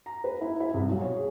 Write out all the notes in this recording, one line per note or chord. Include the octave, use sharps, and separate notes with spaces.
A#5
B4
E4
E4
C2
B1
C#5
G#4